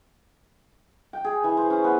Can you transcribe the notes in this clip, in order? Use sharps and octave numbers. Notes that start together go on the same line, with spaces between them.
G5
G#4
E3
C5
C#4
B3